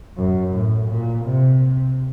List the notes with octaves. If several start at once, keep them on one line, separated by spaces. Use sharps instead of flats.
F#2
A2
A#2
C3